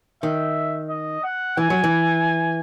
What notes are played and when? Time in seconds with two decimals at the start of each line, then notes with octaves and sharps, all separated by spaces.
0.23 D#3 E5
0.90 D#5
1.24 F#5
1.57 E3 G#5
1.70 F#3
1.84 E3